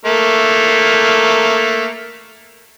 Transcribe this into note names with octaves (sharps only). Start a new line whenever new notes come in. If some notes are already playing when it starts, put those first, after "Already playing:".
A3 A#3